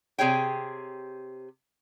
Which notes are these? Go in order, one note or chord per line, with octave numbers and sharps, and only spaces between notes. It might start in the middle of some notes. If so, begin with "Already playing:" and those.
C3 G#4 C#5 G5